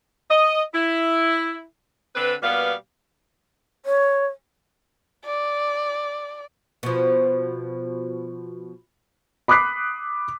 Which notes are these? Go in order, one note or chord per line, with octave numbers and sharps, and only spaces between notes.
D#5
E4
D3 C4 D4 B4
B2 G3 A#3 B3 B4 F5
C#5
D5
B2 F3
B5 D6 D#6 F#6 B6 C7